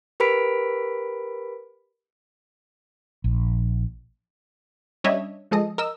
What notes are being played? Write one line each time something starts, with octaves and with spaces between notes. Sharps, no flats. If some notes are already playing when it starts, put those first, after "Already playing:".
G4 A#4 B4 B5 B6 D7
A#1
G3 C#4 D4 C#5 D#5 E5
F3 G#3 A4 D#5
A#4 D#5 E6